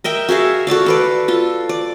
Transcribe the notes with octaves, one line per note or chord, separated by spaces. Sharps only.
A#4 D#5 E5 G5
F#4 G#4 E5 F5
F#4 A4 D5 F5
A4 B4 D5
F4 A4
D5